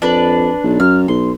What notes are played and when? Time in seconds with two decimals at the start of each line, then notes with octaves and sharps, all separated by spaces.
0.02 F2 D4 B4
0.63 B1
0.80 F#2 F6
1.08 B1 C6